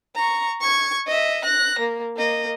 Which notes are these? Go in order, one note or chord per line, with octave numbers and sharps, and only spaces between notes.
A#5 C#6
C#6 G#6
D#5 E5
F#6 A#6
A#3
A#3 D#5